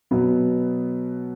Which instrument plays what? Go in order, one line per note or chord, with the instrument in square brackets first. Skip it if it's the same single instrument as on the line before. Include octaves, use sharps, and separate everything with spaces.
[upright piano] B2 F#3 B3